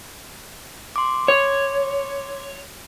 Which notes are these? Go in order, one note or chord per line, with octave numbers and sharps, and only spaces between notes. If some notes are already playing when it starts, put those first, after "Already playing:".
C6 D6
C#5